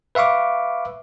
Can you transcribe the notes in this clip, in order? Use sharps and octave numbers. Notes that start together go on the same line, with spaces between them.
B4 E5 F5 C#6 D6